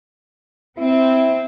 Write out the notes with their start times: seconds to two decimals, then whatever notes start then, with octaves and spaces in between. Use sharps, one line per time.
0.78 C4 E4